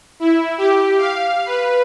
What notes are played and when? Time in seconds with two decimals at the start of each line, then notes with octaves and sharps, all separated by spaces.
0.20 E4
0.58 G4
0.98 F5
1.46 B4